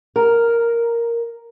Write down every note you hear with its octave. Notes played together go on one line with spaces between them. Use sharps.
A#4